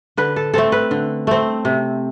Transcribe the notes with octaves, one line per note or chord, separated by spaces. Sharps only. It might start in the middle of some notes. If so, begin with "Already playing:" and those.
D3 B4
A4
A3 C4 A4
B4
D3
A3 C4
C3